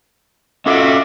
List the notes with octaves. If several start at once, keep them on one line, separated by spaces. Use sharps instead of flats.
C#4 F4 F#4 A4 D#5 E5 D6